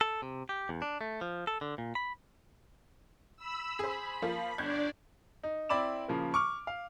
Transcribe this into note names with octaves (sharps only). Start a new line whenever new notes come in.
A4
C3
G4
E2
D4
A3
F3
A4
D3
A#2
B5
B5 E6
G#4 C5 B5
F3 A#3 F4
G1 D4 D5 G6 G#6
D#4
C4 E4 D5 B5 D6 E7
C#3 F3 A#3
C#6 D6 F6
F5